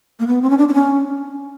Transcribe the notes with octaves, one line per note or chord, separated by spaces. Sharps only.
A#3
B3
C4
C#4
D4
D4
C#4